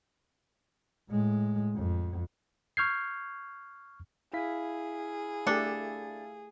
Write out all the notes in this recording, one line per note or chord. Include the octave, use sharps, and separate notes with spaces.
A2 G#3
F2
C#6 F6 G6 G#6 C7
E4 G#4 F5 B6
A3 D4 G4 A4